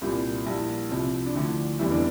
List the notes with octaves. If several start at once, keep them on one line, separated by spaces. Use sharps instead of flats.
C2 A#2 G3 E4
A#1 A#2 G3 E4
C2 C3 F3
D4
D2 D3 F3 E4
F1 E2 E3 G3 E4
D4